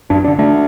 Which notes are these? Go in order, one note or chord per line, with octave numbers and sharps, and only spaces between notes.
F#2 D4
D4
D3
A3 D4